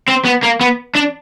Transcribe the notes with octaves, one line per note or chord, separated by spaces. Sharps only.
C4
B3
A#3
B3
D4